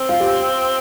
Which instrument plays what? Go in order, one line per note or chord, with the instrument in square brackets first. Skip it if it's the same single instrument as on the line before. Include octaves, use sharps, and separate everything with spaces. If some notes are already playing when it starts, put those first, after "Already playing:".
Already playing: [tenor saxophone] C4
[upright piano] F4
G4